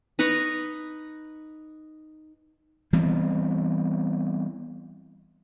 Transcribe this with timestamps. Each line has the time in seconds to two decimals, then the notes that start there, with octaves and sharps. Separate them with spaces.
0.19 D#4 B4 A#5 C#6
2.93 E3 G3 B3 C4